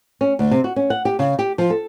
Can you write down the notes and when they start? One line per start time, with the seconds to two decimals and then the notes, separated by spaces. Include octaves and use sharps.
0.21 C#4
0.39 D2
0.51 C3
0.64 F#4
0.76 C#4
0.90 F#5
1.05 G4
1.19 C#3
1.39 G4
1.58 F3
1.70 A4